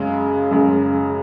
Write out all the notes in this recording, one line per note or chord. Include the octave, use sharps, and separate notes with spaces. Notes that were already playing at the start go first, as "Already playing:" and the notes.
Already playing: F#2 C#3 G#3
F#2 C#3 G#3